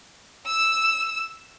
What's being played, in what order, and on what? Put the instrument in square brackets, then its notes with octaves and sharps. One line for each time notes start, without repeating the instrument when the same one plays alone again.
[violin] E6 E7